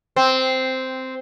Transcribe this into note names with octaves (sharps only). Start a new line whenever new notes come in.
C4